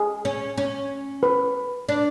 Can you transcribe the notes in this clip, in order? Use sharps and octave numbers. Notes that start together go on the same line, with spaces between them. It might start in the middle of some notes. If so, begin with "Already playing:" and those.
Already playing: G#4
C#4
C#4
B4
D4